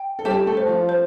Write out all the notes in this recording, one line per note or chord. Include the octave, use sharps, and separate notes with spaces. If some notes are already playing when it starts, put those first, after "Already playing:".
Already playing: G5
A4
G3 G4 A5
A3 A4
C5
F3 F4
C5